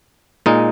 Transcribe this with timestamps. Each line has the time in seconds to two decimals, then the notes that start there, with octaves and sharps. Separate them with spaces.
0.46 A#2 G#3 D#4